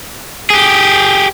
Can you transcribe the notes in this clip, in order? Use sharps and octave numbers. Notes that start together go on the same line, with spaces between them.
G4 G#4